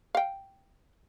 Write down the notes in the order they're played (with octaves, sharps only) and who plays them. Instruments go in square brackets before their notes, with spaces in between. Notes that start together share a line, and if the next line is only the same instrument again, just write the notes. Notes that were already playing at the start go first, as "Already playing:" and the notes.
[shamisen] F5 G5